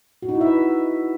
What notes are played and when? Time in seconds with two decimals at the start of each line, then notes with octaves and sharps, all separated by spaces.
0.22 F#4
0.29 D#4
0.35 E4
0.41 E5
0.47 B4